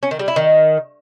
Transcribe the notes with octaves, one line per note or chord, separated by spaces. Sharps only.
C#4
D#3
G3
E4
D#3